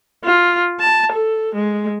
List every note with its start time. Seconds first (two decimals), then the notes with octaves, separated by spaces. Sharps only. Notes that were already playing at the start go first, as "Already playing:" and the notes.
0.24 F4
0.80 A5
1.12 A4
1.55 G#3